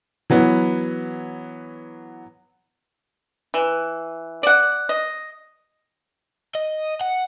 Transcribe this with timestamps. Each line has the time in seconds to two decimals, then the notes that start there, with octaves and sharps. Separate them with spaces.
0.30 E3 F#3 B3
3.54 E3
4.43 D5 F#5
4.89 D#5
6.55 D#5
7.01 F#5